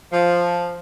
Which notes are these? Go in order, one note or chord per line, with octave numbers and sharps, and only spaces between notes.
F3